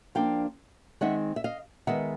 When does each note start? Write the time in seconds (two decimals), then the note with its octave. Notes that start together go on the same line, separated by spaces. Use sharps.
0.15 F3 A#3 D4 F5 G5
1.01 D#3 G#3 C4 D#4 E5 F#5
1.36 E5
1.44 D#5 F5
1.87 D#3 G#3 B3 E5 F#5